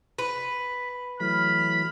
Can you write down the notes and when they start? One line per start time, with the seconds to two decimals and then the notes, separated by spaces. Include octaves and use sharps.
0.18 B4 B5
1.20 E3 F#3 A3 B5 F6